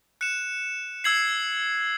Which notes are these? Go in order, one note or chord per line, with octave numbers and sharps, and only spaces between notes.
F#6 C#7 E7
E6 G#6 C7 F#7